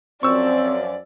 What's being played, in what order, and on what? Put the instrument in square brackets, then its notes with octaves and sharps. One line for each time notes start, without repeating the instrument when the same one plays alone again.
[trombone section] F#2 F3 [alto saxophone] C4 [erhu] D5 [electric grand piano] C#6 E6